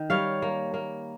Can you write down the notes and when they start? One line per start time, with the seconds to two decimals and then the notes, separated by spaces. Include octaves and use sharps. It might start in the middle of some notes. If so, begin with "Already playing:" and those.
Already playing: D#3
0.10 G3 C#5 F5
0.42 A#3
0.74 A#3